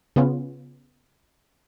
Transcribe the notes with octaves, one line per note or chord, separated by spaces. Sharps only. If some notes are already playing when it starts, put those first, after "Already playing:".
C#3 B3 C#4 F4